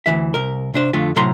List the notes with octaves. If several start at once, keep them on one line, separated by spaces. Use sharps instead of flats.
D2 G#2 E3 E5
C2 A#4
C3 D4 C5
F2 D3 A3 F4
A2 C3 F#3 E4 A#5 C6